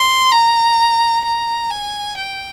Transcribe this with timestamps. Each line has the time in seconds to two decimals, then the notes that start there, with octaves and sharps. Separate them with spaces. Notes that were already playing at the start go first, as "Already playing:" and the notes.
Already playing: C6
0.32 A#5
1.25 A#5
1.71 G#5
2.17 G5